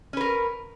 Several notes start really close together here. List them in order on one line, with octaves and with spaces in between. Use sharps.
C#4 B4 A#4